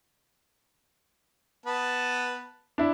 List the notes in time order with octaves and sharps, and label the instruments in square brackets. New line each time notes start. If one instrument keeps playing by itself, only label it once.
[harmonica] B3 B4 A5
[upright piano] D4 E4